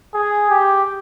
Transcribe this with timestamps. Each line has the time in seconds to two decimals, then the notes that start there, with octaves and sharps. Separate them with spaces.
0.14 G#4
0.50 G4